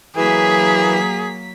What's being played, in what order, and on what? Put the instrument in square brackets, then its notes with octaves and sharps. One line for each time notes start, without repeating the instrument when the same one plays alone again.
[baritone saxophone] E3 [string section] F#3 A#3 B6 [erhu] G#4